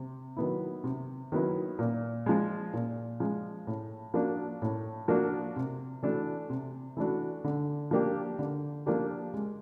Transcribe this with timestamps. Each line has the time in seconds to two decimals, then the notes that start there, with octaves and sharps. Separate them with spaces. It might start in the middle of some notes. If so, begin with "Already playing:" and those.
Already playing: C3
0.37 D#3 F#3 B3 E4
0.84 C3
1.32 D#3 F#3 B3 E4
1.79 A#2
2.26 F3 G#3
2.73 A#2
3.20 F3 G#3
3.67 A2
4.14 F3 A#3 D4 F#4
4.62 A2
5.08 F3 A#3 D4 F#4
5.56 C3
6.03 E3 A3 D4 F#4
6.50 C3
6.97 E3 A3 D4 F#4
7.44 D3
7.91 F3 A#3 D4 G4
8.39 D3
8.86 F3 A#3 D4 G4
9.34 G#3